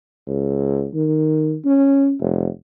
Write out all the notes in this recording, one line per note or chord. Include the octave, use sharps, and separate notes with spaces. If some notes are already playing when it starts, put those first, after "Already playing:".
C#2
D#3
C#4
F1